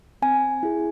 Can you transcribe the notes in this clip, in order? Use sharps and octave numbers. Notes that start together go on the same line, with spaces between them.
C4 G#5
E4 G#4